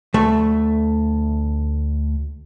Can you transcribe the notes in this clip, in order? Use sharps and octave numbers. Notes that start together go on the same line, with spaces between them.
D2 A3